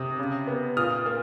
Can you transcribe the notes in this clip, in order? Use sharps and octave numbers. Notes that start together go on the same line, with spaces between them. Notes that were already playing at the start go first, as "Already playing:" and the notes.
Already playing: C3 D#6
C#3
B3
A#2 D#6 F6
A#3